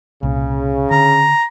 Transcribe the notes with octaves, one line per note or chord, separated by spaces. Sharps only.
C2 A#2 C#3
D3 A#5